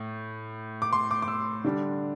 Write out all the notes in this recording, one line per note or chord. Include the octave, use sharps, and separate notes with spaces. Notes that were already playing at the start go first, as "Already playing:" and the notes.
Already playing: A2
D6
C6
D6
D6
E6
D3 G3 D4